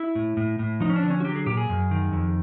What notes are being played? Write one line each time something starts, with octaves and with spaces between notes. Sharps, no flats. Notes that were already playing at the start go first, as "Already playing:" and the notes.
Already playing: E4
A2
A2
A2
F3 D#4
C#4
D4
D3
C#4
F#4
F#3 G4
G#4
A#2 G4
G#4
F#2
D#3
F2